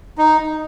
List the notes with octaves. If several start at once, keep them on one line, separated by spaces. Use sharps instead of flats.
D#4